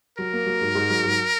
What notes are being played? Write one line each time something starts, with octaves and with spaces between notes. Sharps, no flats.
F#3 A#4
A#3
F#3
G#2
G#2
F#3
G#2